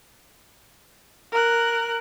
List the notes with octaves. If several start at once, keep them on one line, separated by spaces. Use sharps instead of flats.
A#4 F#6